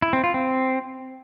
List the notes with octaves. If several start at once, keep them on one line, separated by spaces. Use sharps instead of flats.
E4
C4
F4
C4